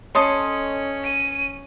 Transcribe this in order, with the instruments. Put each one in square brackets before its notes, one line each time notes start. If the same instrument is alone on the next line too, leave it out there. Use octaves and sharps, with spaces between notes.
[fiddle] C#4 [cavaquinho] A4 D#5 C6 [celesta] C#5 D#6
[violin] D#7